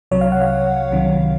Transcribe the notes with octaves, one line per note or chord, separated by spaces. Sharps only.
C2 C3 F#3 C#5
F5
F#5
F5
C2 C3 D#3 F#3